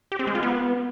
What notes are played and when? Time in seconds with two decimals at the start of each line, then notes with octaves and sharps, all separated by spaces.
0.12 G4
0.19 C4
0.27 G#3
0.35 F4
0.43 B3